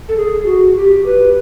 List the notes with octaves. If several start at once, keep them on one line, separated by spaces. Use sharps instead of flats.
A4
G#4
F#4
G4
B4